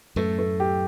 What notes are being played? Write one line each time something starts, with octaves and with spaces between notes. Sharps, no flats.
F#2 A2 A3
A3
G4